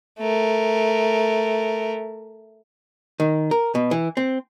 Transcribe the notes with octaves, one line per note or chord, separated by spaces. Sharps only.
A3 A#4
D#3
A#4
B2
E3
C4